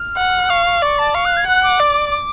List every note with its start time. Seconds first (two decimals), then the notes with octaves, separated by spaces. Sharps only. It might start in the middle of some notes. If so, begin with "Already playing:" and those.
Already playing: F6
0.17 F#5
0.49 F5 C#6
0.66 C#6
0.82 D5 C#6
0.99 A5
1.14 F5 C#6
1.25 F#6
1.37 G#6
1.47 F#5 F#6
1.63 D6
1.79 D5